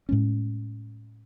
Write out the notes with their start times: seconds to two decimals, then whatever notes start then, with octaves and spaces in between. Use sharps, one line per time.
0.09 A2 G#3 C#4